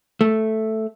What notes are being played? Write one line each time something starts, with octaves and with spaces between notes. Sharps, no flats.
A3